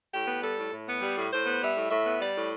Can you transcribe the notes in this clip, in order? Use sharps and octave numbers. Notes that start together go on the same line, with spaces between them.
A2 G4
B3
G3 A4
A2
A2
B3
G3
A2
A2 C5
B3
G3 E5
A2
A2 E5
B3
G3 D5
A2